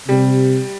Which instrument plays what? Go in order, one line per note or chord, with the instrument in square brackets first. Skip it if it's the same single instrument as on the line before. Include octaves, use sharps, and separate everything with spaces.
[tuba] C3 [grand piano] G3